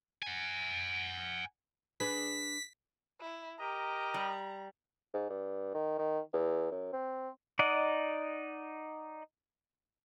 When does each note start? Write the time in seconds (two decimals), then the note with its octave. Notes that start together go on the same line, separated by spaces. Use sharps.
0.23 F#5 G#5
2.00 D4 G#4 B4 B6
3.21 E4
3.59 G4 A#4 D#5 A#5
4.14 G3
5.14 G#2
5.30 G2
5.74 D#3
5.99 D#3
6.33 E2
6.72 F#2
6.93 C4
7.59 D#4 D5 D#5 F#5